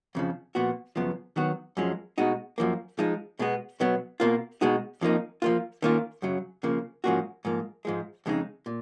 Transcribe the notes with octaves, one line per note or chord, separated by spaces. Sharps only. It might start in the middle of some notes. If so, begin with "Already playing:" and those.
F2 C#3 F3
A#2 F3 B3 F#4
F#2 C#3 F3 B3
D#3 F#3 B3 F#4
F#2 F3 G#3 C#4
B2 G#3 D#4 F#4
F#2 F3 A#3
F3 G#3 D#4
B2 G#3 B3
B2 F#3 B3
B2 A#3 F4
B2 G#3 D#4 F#4
F2 F3 A#3 D#4
F3 A#3 F4
D#3 A#3 C#4 F4
F#2 C#3 F#3
C#3 F3 A#3
G#2 F3 A#3 C#4 F#4
G#2 F3 A#3
G#2 F3 G#3
F2 C#3 G#3 B3 D#4
A#2